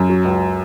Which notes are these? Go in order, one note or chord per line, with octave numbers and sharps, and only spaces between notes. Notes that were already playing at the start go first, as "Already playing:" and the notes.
Already playing: F#2
F#3
C#2